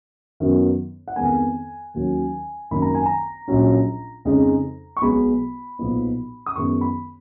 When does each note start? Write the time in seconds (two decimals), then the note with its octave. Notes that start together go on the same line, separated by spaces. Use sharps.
0.40 F#2 D#3 F#3 B3
1.08 F#5
1.16 F2 D#3 G#3 B3 G#5
1.94 D#2 D#3 F#3 C#4
2.71 G#1 F#2 D#3 F#3 A#3 B5
2.82 A#5
2.94 G#5
3.06 A#5
3.48 A#1 A#2 F#3 C#4
4.25 F2 C#3 G#3 D#4
4.97 C#6
5.02 B1 B2 G#3 B3 B5
5.79 B1 A#2 F3 B3 D#4
6.46 D#6
6.56 F#2 D#3 G#3 B3 C#6
6.81 B5